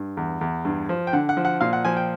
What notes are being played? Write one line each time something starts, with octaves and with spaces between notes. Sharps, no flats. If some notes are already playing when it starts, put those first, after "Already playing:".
Already playing: G2
E2
E2
G2
F3
G5
D3 F#5
F#5
F3
F#5
A#2 F5
F#5
F3 G#5
G5